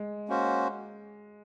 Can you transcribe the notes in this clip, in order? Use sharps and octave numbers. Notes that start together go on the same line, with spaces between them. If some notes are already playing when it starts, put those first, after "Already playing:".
Already playing: G#3
A#3 C#4 F#4 C5